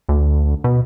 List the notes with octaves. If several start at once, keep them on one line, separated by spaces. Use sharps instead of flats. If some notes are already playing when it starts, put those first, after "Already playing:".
D2
B2